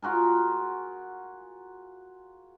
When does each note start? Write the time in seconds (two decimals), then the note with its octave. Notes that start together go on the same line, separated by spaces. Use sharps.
0.02 F4 F#4 G#4 A#4